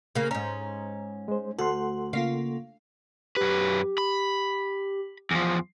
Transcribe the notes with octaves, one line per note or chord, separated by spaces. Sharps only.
C#3 A#3
G#2 C#4 A#5
G#3 C5
D2 F#4 A4 F#5 C6
C#3 A#3 F4 F5
F#2 G4 B4
B5
E2 F3